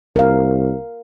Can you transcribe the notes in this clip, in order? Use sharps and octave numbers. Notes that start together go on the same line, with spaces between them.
C2 A#4 F5